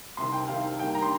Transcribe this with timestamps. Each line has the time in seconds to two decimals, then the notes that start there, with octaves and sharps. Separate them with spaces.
0.17 C2 C3 D#3 C6
0.32 G5
0.48 C2 C3 D#3 F5
0.79 G2 D#3 G3 A#3 G5
0.95 A#5
1.02 C6